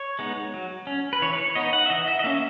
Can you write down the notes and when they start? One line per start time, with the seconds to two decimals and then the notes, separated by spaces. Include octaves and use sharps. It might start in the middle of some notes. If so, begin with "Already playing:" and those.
Already playing: C#5
0.19 G#3 B3 D#4
0.54 F#3
0.87 C#4
1.13 B4
1.22 E3 C#5
1.33 B4
1.38 C#5
1.55 B3 D#4 D#5
1.73 F#5
1.86 E5
1.90 E3 D#5
2.08 E5
2.19 D#5
2.24 A#3 C#4 E5